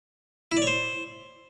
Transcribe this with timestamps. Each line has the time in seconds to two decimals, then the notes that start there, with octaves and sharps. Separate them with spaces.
0.52 E4
0.57 D5
0.62 C#5
0.67 C5